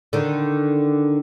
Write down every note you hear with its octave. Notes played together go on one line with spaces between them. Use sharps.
D3 D#3